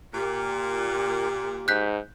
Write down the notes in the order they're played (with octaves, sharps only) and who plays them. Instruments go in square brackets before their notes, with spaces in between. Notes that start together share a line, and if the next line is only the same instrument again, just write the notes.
[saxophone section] A#2 [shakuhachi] G4
[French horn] G#2 [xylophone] F#6 G6 B6